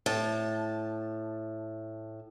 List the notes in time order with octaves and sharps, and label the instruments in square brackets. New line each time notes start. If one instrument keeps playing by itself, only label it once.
[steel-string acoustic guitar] A2 A5